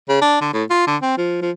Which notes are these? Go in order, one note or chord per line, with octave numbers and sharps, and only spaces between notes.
C#3
D4
D3
A2
F4
D3
C4
F3
F3